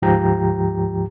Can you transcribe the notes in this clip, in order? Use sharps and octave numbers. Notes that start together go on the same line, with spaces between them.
D2 G#2 F3 G4 G5 A#5